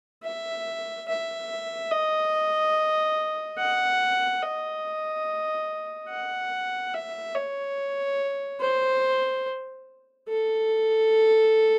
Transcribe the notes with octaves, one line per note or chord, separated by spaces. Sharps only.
E5
E5
D#5
F#5
D#5
F#5
E5
C#5
C5
A4